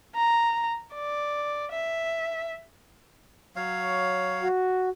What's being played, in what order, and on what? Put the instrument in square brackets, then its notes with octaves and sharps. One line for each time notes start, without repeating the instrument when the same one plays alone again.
[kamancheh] A#5
D5
E5
[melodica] F#3 C#5 F5
[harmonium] F#4